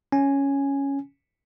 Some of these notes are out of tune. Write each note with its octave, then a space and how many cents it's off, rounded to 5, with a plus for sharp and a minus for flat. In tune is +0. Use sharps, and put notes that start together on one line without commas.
C#4 +0 G#5 +0